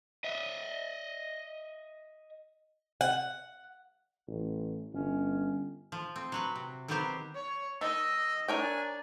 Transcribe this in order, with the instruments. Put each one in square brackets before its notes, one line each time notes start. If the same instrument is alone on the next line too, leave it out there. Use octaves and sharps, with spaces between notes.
[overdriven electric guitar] D#5 E5
[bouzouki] F#5
[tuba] A1
[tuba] G1 [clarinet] C#4
[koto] F3
C4
F#3 F#4 B4
C3
D#3 F#3 B3 C4 G4 C5
[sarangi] C#5
[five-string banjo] D#3 [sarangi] D#5 [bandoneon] E6
[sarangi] D4 [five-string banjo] A#4 C#5 G5 [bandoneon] G#5